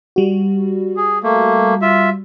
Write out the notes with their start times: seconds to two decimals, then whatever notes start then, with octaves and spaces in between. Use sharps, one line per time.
0.16 G3 F#4
0.97 G#4
1.23 A3 A#3
1.82 F4 E5